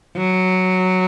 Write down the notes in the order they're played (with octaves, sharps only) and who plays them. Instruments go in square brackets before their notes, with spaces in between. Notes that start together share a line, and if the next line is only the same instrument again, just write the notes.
[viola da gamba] F#3